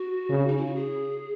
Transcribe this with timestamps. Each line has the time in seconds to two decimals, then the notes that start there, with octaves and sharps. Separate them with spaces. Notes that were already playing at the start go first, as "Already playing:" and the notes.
Already playing: F#4
0.30 C#3
0.48 D#4
0.57 E4
0.66 F#4
0.75 G#4